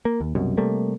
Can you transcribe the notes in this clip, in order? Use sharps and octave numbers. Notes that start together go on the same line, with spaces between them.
A#3
D#2
C2 F#2 B2
C3 G3 A3 A#3